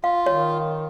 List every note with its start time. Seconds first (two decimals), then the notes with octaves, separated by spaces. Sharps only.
0.04 F4 F5
0.26 D#3 C#5